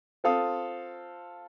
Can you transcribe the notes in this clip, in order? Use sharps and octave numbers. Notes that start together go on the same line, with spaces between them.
C4 F4 A4 F5 D#6